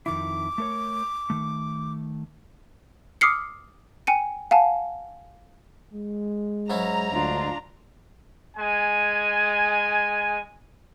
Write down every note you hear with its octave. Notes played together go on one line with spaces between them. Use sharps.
F2 D#3 E4 D6
A3 A#4 C#5
D#3 A3
D6 D#6 F6 C7 C#7
G5 G#5 C#7 D#7
F5 F#5 G#5 A5
G#3
G#2 F#3 C#4 E4 A#5
D2 D4 F4
G#3 G#5